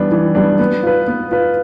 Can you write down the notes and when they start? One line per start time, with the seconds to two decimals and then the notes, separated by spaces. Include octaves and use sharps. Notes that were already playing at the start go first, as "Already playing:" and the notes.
Already playing: E3 G3 B3 D4
0.12 E3
0.35 G3 B3 D4
0.59 B3
0.83 F4 B4
1.08 B3
1.31 F4 B4